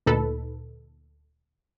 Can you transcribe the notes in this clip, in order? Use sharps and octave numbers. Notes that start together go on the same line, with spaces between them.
D2 A#2 D#4 A4 B4 B5